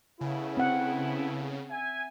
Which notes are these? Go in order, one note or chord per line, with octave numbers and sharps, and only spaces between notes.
C#3 A3 B3 E4
C4 F#5
E5 G#5